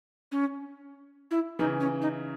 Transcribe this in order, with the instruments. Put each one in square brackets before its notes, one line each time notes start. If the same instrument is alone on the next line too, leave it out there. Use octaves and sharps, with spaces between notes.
[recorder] C#4
E4
[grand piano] C#3 E3 [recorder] D#4
[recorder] C#4
D#4